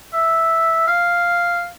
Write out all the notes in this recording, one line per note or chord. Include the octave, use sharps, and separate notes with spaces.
E5
F5